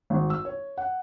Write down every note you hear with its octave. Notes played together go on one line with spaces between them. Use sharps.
G#1
E6
C#5
F#5